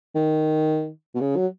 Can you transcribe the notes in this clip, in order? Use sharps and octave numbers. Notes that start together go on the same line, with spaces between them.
D#3
B2
C#3
F#3